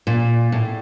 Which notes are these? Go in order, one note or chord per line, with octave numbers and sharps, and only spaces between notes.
A#2
A2